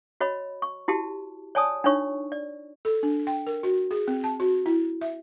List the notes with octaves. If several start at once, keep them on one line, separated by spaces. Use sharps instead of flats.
F#4 C#5 D#5 B5
C#6
E4 F#4 G4 A5
C#5 D5 G#5 A5 D#6
D4 D#4 F4 C#5 C#6
D5
A4
D4
G5
A#4
F#4
G#4
C4
A5
F#4
E4
E5